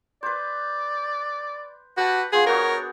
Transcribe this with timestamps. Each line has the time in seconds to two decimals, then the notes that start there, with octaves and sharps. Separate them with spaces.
0.23 B4 C5 D5
1.97 F#4 G4 B4 A5
2.32 B3 F4 G#4 C5
2.46 D4 F#4 G#4 A#4 C#5